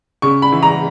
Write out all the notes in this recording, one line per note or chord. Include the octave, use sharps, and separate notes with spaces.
C#3 C#6
B5
E3
A#5